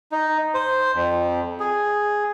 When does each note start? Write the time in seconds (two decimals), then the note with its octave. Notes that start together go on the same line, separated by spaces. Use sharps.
0.12 D#4
0.54 C5
0.94 F2
1.60 G#4